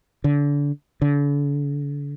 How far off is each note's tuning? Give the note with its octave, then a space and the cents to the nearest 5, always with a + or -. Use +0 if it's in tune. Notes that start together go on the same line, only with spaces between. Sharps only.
D3 -30
D3 -40